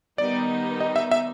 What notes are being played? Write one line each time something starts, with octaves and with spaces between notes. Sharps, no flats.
D#3 G3 B3 D#4 D5
D#5
E5
E5